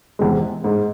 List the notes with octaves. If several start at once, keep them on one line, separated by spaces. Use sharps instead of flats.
E2 C3 E3 G#3
G#2